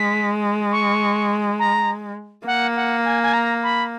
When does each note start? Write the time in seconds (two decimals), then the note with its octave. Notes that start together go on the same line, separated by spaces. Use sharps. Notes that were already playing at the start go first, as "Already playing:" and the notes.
Already playing: G#3 B6
0.72 C#6
1.59 A#5
2.46 A#3 F#5
2.76 F#5
3.05 G#5
3.23 G#5
3.33 A#5
3.63 B5